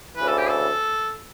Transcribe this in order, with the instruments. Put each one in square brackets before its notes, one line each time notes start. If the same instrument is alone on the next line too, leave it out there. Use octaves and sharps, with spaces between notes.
[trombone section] D2 C#3 E3 [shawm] B4
[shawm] A4
G4
A4